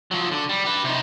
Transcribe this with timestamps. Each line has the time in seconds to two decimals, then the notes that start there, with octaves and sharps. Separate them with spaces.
0.11 F3 F#3
0.31 D3
0.49 G3
0.65 G4 B4
0.84 C3 D#4